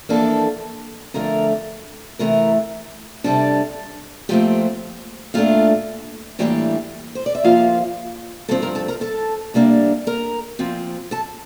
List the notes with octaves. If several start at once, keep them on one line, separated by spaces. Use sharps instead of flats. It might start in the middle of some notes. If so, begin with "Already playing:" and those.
F2 E3 A#3 D4 A4 A5
F2 D3 A3 A#4 A#5
C3 E3 A3 A#4 A#5
C3 G3 D4 A4 A5
A#2 F3 A3 C4 G4 G5
A#2 A3 D4 F4 F5
A2 E3 G3 A#3 D4 G4 G5
C5
D5
E5
F2 C3 F3 A#3 F4 F5
G2 F3 C4 A4 A5
A#4 A#5
A4 A5
A#4 A#5
A4 A5
C3 G3 A#3 D4
A#4 A#5
A#2 F3 C4
A4 A5